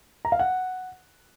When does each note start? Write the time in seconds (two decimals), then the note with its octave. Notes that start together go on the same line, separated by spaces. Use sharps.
0.25 A#5
0.32 F5
0.40 F#5